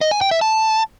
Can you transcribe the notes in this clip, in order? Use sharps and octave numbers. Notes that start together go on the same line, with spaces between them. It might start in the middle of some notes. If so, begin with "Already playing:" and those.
D#5
G#5
G5
E5
A5